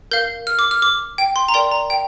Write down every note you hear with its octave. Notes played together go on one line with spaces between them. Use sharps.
A#4 F5 G6
F6
D6
F6
D6
G5
C6
A#5
A#4 D5 G5 C6
A#5
G5